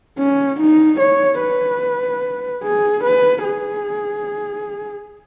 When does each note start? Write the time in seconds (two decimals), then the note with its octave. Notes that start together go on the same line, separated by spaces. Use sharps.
0.19 C#4
0.60 D#4
1.00 C#5
1.40 B4
2.63 G#4
3.03 B4
3.44 G#4